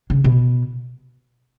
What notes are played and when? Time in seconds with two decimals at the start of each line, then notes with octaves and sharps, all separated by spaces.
0.10 C#3
0.24 B2